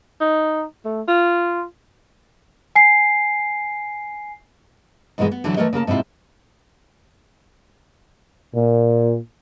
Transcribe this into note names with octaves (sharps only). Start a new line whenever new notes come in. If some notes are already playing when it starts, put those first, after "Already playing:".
D#4
A3
F4
G#5 C7
D#2 G#2 B2 E3 G#3
B3
D3 E3 F#3 D4 E4
E3 A3 B3 A#4 C#5 D#5
C#3 A#3 A#4 A5
G#2 C3 C4 E4 F4
A#2